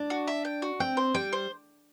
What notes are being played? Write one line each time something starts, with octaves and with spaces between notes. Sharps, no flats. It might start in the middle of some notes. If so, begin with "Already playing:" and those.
Already playing: D4
F#4
E5
G5
F#4
C4 G5
C5
G3 G5
C5